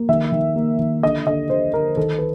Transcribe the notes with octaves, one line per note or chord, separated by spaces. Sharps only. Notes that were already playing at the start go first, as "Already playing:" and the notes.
Already playing: A#3
D#3 E5
D#3
A#3
D#3
D3 D#5
D3 D#5
D3 C5
D3 A#4
D#3 A4
B4